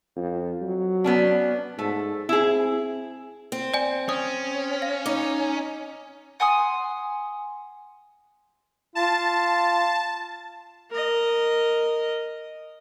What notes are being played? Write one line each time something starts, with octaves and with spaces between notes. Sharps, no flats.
F2
F#3
B3 C#4 D4
G#2 A3
C4 E4 G#4
C4
D5 G#5
C#4 D#6
F5
D#4 D6
F#5 G#5 C6 D#6
F4 A5
A#4 D#5